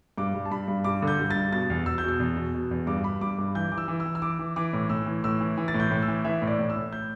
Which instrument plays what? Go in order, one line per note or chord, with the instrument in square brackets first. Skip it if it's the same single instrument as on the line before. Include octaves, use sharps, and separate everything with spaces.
[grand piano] G2 D6
G2
A5
G2 B5
G2
G2 D6
D3
G6
G2
G2 A6
B2 A6
E2
E2 E6
G6
B2 E6
E2
B2
B2
E2
G2 D6
G2 B5
G2 D6
G2
E3 G6
E3 D6
E6
E3
E6
E3
E6
E3 D6
E3
E3 D6
A2
A2 E6
E3
A2 E6
E3
E3
A6
A2
G6
A2
E6
E3
E3 E5
A2
D5
A2
E6
A2
G6